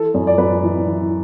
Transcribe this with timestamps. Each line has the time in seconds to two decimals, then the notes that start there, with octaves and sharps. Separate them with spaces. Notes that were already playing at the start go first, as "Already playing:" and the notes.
Already playing: E3 A4
0.14 F#2
0.27 D5
0.38 F#2 B4
0.63 E3
0.87 E3